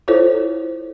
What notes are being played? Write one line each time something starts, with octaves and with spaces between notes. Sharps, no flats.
E4 F4 A4 C5 C#5